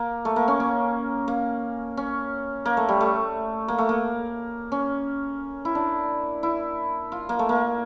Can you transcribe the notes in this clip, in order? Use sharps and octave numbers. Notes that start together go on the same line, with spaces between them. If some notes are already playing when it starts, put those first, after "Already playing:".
Already playing: A#3
A3
A#3
C#4
A#3
A#3
C#4
A#3
A3
G3
A3
A#3
A3
A#3
C#4
E4
D4
E4
F4
A#3
A3
A#3